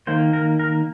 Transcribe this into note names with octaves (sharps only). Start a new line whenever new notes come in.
D#3 A#3 C5
A#4
A#4